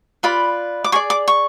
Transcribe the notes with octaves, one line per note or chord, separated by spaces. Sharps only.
F4 B4 D5 B5
D6
G#4 D5 C#6
D6
C#6